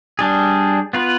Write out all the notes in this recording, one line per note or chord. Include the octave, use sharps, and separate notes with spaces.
G3 D4 G#4
B3 F4 B4